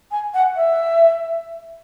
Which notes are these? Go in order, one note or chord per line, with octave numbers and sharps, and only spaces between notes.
G#5
F#5
E5